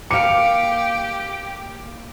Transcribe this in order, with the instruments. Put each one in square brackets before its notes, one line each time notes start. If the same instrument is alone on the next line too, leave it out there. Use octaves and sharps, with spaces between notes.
[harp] A#3 F5 [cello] G4 [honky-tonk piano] D6 C#7